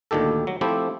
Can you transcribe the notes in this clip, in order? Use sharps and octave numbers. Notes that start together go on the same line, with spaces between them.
D2 A#2 D#3 G4 A4
F#3
F3 A3 C4 E4 G4